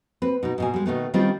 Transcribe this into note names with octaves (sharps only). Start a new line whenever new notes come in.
C4 B4
B2 D#4
G#2 B2 G#5
G3 G#3
B2 D#3 A3 B3
D#3 G3 C4 C#4 F4